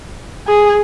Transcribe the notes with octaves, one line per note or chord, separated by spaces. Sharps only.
G#4